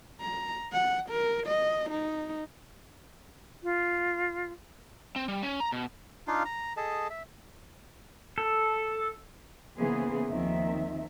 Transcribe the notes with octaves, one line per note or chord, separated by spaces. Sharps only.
A#5
F#5
A#4
D#5
D#4
F4
C4
G3
C#4
A#5
B2
D4 D#4 F4 F5
A#5
G#4 A4 D#5 A5
E5
A4
C#3 E3 A#3 B3 G#4 C5
D#2 D#3 F3 C4 E5